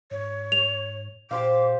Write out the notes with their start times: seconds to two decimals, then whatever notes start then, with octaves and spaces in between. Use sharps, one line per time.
0.11 G#2 C#5
0.52 F7
1.31 A#2 G4 C5 F5 D6